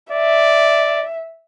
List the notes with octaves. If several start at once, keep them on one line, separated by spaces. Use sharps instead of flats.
D5 E5